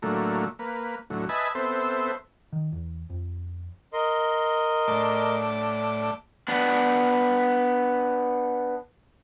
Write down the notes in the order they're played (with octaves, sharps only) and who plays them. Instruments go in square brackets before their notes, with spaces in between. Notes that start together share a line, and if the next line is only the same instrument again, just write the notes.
[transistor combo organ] A2 D3 F#3 A3 A#3
A#3 B4
D2 A2 F#3
B4 D#5 E5 G#5 A5 B5
B3 C4 A4 C5 E5
[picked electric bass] D#3
E2
F2
[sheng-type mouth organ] A#4 D#5 C6
[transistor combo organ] A2 A3 D5
[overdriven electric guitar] B3 D4